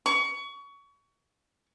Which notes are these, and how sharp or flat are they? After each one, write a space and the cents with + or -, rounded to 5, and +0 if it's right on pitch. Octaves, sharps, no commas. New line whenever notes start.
C#6 +25